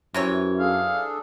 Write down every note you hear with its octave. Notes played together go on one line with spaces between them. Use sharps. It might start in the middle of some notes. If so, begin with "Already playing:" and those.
F#2 C3 E3 C#5
D4 G#4 A4 F5